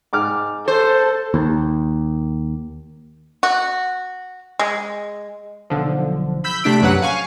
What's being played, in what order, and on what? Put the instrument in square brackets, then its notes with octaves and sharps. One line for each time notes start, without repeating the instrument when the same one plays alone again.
[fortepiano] G#2 D6 F6
[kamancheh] A4 [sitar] C5
[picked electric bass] D#2
[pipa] F#4
G#3
[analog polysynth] B1 D3 F3
B5 E6 G6 B6
C3 A3 D4 B6 D7
A#1 F#2 F#3 B4 F#5 F#6
F5 G#5 C#6